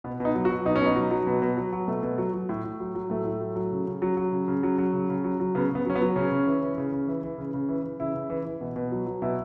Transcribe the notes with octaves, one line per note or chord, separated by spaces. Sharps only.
B2 B3
B2 D#4
F#3
F#4
F#3
B2 D#4
C#4
B2 D#4
F#3
F#3
B2
B2
F#3
F#3
B2 A3
B2
F#3
F#3
A2
A2
F#3
F#3
A2 A3
A2
F#3
F#3
C#3
C#3
F#3
F#3
C#3
C#3
F#3
F#3
C#3
C#3
F#3
F#3
C#3 B3
C#3 B3
F#3 C#4
B3
F#3
C#3 C#4
C#3
E3
E3
C#3
C#3
E3
E3
C#3
C#3
E3
E3
C#3 E4
C#3
E3
E3
B2
B2
F#3
F#3
B2 E4